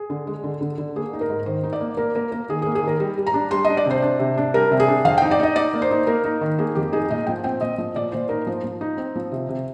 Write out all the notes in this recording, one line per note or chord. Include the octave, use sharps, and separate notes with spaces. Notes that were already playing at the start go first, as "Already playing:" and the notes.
Already playing: G#4
D3
G#3
D3
D3
D3
A#3 G#4
D#4
A#4
G#2
D#3 C5
D#4
D5
A#3
A#3 A#4
A#3 A#4
A#3 A#4
D#3 G#4
G#4
A#3
G#4
D#3 A#4
G3
G3
A#5
D4
G3 C6
D#5
D4
D5
C3 C5
D4
C3
D4
G3 A#4
C3
G#4
D4
F2 F5
G5
D#4
D5
D#4 D#5
D#4 D5
A#3
C5
D#4
A#3 A#4
D#4
D#3
A#3 G#4
F2 G4
D#4 G#4
A#2 D#5
F3 G5
C4 G5
A#2 D#5
F3 D#5
A#2 D5
A#2 C5
D#4 A#4
F3 C5
F3
D#4
C4
F3
C3
C3